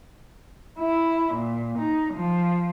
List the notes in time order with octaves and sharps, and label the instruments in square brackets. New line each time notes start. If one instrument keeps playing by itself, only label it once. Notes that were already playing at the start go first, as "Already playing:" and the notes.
[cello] E4
A#2
D#4
F3